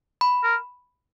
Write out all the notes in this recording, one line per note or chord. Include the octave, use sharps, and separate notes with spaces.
B5
A#4